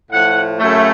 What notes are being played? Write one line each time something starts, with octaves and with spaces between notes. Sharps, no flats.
A2 F3 A3 F#5
F#2 C#3 F#3 A3